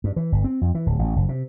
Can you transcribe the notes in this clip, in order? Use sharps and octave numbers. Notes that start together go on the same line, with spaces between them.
G2
E3
G1
C4
F2
E3
D1
A1
F#1
C3